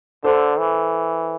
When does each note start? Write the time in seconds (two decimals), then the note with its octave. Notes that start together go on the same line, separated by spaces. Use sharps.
0.24 D3 A4 C5
0.59 E3